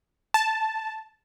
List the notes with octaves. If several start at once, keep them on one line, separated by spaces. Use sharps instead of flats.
A5